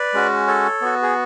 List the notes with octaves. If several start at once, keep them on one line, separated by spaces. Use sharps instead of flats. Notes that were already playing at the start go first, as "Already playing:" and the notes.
Already playing: B4 D5
G#3 C#4 F#4
A4 C#5
B3 F#4
G#4